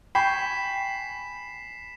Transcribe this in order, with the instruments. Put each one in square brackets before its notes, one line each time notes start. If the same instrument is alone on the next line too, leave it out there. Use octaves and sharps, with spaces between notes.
[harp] G5 G#5 C#6 [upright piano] B5 [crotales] B6 C7 E7